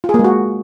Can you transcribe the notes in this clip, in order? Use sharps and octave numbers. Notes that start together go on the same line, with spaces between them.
F4
G#4
A#3
G#3
F#4